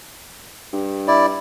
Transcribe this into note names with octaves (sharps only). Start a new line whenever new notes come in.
G2
E4 D5